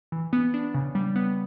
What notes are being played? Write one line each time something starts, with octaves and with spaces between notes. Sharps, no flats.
E3
B3
D4
C#3
G3
B3